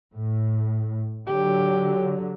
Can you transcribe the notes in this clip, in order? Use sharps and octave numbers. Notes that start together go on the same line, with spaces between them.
A2
D3 F#3 G4